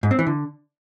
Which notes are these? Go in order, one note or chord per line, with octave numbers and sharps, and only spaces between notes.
G#2
C4
E3
D3